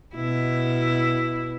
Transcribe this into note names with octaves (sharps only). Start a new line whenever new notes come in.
B2 E4